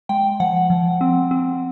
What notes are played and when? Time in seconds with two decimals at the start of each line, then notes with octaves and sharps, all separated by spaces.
0.09 G#3 G5
0.40 F3 F#5
0.70 F3
1.01 C4
1.31 C4